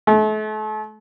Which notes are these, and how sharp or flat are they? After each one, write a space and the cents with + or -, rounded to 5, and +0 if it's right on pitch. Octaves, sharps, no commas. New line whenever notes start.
A3 -40